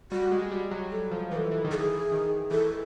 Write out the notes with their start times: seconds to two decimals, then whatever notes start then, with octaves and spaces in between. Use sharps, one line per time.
0.11 G3 F#4
0.32 G#3
0.42 G#3
0.51 G3
0.71 F#3
0.91 F#3 A4
1.11 F3
1.31 E3 A4 B4
1.51 E3
1.65 D#3
1.71 E3 G#4 A4
2.11 D#3
2.51 E3 A4